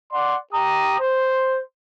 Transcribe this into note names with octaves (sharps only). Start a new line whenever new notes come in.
D5 F#5 C6
G4 A#5 D#6
C5